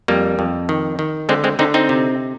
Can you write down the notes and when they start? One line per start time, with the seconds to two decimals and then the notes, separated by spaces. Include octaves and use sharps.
0.08 F2 G3 A#3
0.39 F2
0.69 D#3
0.99 D#3
1.29 D3 G#3 C4
1.44 G#3 C4
1.59 D3 C4 D#4
1.74 C4 D#4
1.89 C3